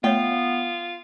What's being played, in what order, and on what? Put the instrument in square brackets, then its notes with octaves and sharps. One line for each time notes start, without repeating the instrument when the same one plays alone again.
[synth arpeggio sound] A3 C#5 E5 [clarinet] B3 [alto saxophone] F4 [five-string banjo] G5